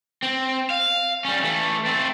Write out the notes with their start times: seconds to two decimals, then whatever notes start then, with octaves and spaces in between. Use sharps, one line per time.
0.23 C4
0.70 F5
1.25 G3 C#4
1.43 E3 A3
1.85 A3 C4